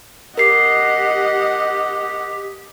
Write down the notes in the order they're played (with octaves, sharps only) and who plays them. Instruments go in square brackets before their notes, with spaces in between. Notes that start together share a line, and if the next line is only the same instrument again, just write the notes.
[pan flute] G4 [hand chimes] A#4 C7 [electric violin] D#5 F#5